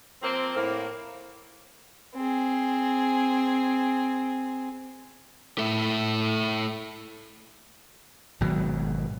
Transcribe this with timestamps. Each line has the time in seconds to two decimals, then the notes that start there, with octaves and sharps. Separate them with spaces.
0.22 F3 A#3 C4
0.55 A2 A#3
2.15 C4 G#4
5.58 A3 E4
8.41 G#1 B2 F#3